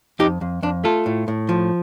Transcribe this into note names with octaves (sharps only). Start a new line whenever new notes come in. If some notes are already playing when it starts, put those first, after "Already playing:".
F2 D#4 G4
F2
F2 D4
A3 F4 A4
A2
A2
F3